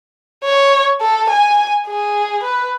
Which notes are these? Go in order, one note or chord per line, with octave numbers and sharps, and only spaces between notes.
C#5
A4
G#5
G#4
B4